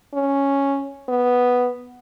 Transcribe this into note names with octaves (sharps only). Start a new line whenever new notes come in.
C#4
B3